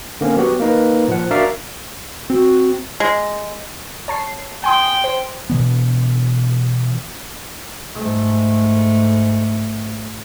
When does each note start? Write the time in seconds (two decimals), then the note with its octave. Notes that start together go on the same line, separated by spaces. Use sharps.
0.21 D3 A#3 C4 C#4
0.37 F#3 B3 F#4 G4
0.60 A#3 D#4 B4
1.08 A#2 F3 F#5
1.30 D4 F#4 A#4 D5 E5 F5
2.30 C4 F#4
3.00 G#3
4.08 C#5 A5 C7
4.64 G5 G#5 C6 D#6
5.04 C5
5.50 B2 E3 B3
7.94 G#2 A3